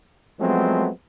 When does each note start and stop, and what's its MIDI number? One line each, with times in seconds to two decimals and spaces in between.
0.40 0.89 53
0.40 0.89 54
0.40 0.89 56
0.40 0.89 57
0.40 0.89 59
0.40 0.89 60